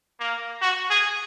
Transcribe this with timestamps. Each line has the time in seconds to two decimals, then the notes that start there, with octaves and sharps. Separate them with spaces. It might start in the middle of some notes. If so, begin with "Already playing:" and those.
0.20 A#3
0.62 F#4
0.90 G#4